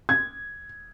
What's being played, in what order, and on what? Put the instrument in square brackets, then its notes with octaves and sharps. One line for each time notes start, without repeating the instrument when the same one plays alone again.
[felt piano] G#6